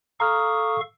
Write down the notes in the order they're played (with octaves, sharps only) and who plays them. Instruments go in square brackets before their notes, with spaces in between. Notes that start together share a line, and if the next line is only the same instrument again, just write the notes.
[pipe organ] A4 F5 C#6 [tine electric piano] A#5 F6 [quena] D#6